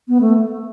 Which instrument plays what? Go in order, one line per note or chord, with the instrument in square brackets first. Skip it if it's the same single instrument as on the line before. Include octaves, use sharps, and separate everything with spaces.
[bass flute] B3
A3